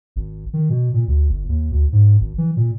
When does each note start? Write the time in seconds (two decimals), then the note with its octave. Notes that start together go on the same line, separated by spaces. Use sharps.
0.16 G#1
0.53 D#3
0.70 B2
0.94 A#2
1.08 D2
1.29 G1
1.49 D#2
1.72 D2
1.93 G#2
2.20 G#1
2.38 E3
2.57 A#2